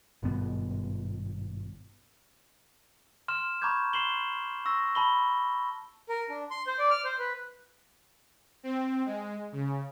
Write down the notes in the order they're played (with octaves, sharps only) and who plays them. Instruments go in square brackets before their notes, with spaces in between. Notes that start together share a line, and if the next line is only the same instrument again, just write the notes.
[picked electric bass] G#1 G2 B2 B3
[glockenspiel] C6 F6 E7
A#5 B5 C#6 D6 G6 G#6
C6 C7 E7 F#7 G7
C#6 E6 A#6
A5 B5 G7
[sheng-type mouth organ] A#4
D4
C6
C5
D5
F6
C5
B4
[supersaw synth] C4
G#3
C#3